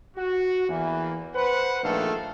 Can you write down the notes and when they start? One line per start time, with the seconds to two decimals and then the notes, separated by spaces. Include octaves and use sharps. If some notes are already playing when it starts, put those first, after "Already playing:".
0.17 F#4
0.69 E2 E3 A#3
1.34 B4 C5 F#5
1.83 A#1 A#2 D#3 A3 A4 F5